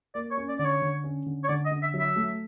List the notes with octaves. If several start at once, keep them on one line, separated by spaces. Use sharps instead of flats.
A#3 D5
C#5
C#4
D5
D3 D5
C#5
D3
C#4
D3
C#5
D3 D5
D#5
D3
E5
F#3
E5
A3